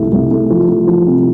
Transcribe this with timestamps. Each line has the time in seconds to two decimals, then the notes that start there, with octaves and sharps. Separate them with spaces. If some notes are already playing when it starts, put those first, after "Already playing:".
Already playing: C2 F3 A3
0.12 C2
0.31 A3
0.50 F3
0.68 A3
0.87 F3
1.07 C3